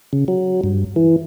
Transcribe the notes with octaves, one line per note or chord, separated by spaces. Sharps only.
C#3
F#3
G2
E3